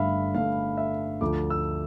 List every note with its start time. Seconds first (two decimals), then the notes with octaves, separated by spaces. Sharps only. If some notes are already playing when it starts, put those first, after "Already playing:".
Already playing: G1 G2 D3 A3 E5 F5 B5
0.35 G1 G2 D3 A3 F5
0.77 E5
1.21 D2 D3 F3 A3 D6
1.50 E6